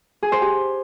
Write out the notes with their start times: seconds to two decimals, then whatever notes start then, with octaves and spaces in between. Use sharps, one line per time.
0.23 G#4
0.32 C5
0.42 G4